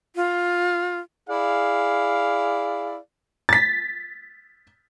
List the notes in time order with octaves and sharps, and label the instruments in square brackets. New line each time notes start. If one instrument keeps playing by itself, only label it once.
[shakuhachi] F4
[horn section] E4 G#4 D5 F5
[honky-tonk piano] A6 B6